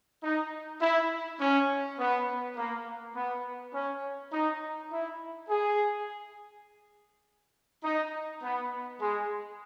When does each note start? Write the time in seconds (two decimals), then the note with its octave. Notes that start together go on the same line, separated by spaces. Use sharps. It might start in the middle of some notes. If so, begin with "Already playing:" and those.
0.23 D#4
0.81 E4
1.39 C#4
1.98 B3
2.56 A#3
3.15 B3
3.73 C#4
4.32 D#4
4.91 E4
5.49 G#4
7.83 D#4
8.42 B3
9.00 G#3